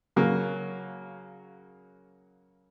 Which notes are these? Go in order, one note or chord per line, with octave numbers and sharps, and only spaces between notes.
C#3 F#3 A#3